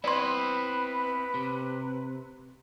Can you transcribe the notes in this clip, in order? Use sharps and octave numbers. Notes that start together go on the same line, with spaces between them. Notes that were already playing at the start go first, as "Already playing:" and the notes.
B3 C4 E4 B4 D5 B5 C6
C3